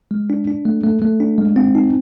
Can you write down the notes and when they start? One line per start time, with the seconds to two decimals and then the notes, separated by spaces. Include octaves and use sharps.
0.11 G#3
0.30 D4
0.47 D4
0.65 A3
0.84 A3
1.02 A3
1.20 D4
1.38 G#3
1.56 C4
1.75 D#4